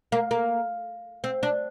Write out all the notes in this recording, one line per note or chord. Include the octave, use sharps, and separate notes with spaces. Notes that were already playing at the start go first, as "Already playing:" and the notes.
A#3
A#3
C4
D4